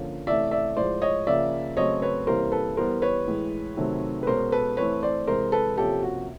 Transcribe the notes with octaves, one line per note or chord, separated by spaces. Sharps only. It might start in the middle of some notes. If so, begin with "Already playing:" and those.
Already playing: D3 F3 A#3 C#4
C3 E3 A3 C#4 D5 E5
D5 E5
A2 F3 G#3 C5 D5
C#5 D#5
C#3 F3 A#3 C#4 D5 E5
C#3 F#3 A3 C4 C#5 D#5
B4 C#5
C3 E3 G3 A#3 C#4 A#4 C5
A4 B4
E3 G3 B3 A#4 C5
B4 C#5
A2 E3 G#3
C3 D#3 F#3 A3 C4
B4
B2 G#3 C#4 A#4 C5
A4 B4
E3 A3 C4 B4 C#5
C5 D5
C3 E3 G#3 A#4 C5
A4 B4
C3 F3 A#3 C#4 G4 A4
F#4